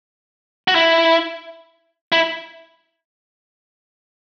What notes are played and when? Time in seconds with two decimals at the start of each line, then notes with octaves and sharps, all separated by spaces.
0.68 F#4
0.75 E4
2.12 E4